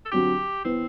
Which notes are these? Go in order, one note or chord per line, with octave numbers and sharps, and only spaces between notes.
A4
D3 F#3 C4 F#4 G4
E3 B3 C4 E4